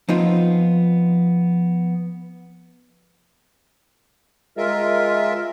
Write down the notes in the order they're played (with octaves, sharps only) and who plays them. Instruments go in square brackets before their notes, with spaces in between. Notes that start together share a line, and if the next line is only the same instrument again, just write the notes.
[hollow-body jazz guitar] F3 B3 C4 D#4 F4
[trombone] G#3 [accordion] F4 A#4 E5